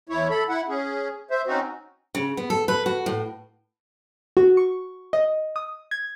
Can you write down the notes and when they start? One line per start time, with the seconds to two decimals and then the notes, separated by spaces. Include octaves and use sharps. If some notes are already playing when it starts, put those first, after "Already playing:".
0.09 E2 E4 C#5
0.30 A4 B5
0.49 E4 F#5
0.68 C#4 G#4
1.30 C5 E5
1.47 C4 C#4 D#4 F#4
2.15 C#3
2.37 B3
2.50 A4
2.68 B4
2.86 F#4
3.06 A2
4.37 F#4
4.57 C#6
5.13 D#5
5.56 D#6
5.91 G#6